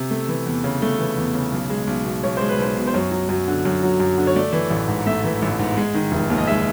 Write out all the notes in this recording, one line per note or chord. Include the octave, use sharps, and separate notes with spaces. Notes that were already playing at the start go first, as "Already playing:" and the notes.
Already playing: C3
A3
E3
E2
C#3
A3
E3
E2
C#3
B1
G#3
B1
B2
B1 C#5
G#3 C5
B4
B1 C5
B2
C5
F#2 C#5
F#3
F#2
D3
F#2
F#3
F#2
D3
C#5
A3 D5
E3
A1
G#2
A3 E5
E3
A1
G#2
G#3
D#3
F1
D#2
D#5
G#3 E5